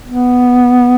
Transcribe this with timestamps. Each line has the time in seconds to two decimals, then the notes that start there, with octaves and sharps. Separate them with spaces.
0.08 B3